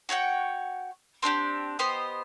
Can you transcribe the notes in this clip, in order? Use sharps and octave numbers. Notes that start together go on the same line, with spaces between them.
F#4 C#5 F#5 G5
C4 D4 F#4 G4
B3 G4 C5 D#5